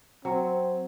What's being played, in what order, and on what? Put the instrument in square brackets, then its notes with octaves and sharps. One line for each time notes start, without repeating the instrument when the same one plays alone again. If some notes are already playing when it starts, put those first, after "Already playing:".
[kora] F#3 [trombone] C4